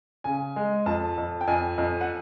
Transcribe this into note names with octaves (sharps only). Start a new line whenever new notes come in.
C#3 G#5
G#3
F2 A5
F2
G5
F2 G#5
F2
F#5